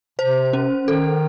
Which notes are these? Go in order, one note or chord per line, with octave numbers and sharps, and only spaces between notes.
C3 C5
C#4
D#3 A4